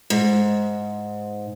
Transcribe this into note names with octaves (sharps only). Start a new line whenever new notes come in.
G#2